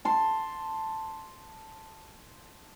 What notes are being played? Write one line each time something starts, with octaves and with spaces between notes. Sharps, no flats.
A5 C6